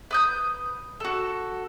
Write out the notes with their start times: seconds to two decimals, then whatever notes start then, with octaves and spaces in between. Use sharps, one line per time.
0.11 B4 D#6 G6
1.00 F#4 A4